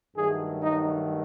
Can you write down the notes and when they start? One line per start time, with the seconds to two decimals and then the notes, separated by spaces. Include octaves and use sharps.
0.16 G2 D#3 F#3 A3 G#4
0.62 D#4